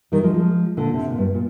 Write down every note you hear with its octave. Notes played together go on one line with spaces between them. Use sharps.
D#3 G3
F3 G#3
F3 G#3
A#2 D3
C3
A#2
G2
A#2